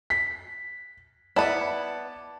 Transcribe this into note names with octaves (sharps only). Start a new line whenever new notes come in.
B6
B3 E4 D5 A5